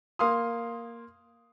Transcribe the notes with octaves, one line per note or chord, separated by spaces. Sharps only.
A#3 F5 C6 D#6